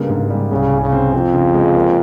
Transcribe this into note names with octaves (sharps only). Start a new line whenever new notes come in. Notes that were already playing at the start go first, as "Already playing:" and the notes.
Already playing: G2 C#3 A#3
G#2
G3
C2 C#3
C2
C#3
C4
F2 C4
C#3
G#3
A#3